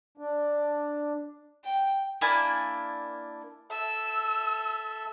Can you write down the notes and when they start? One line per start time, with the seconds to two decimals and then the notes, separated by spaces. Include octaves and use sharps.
0.18 D4
1.64 G5
2.21 A#3 D4 E4 G#5
3.71 A4 E5 E6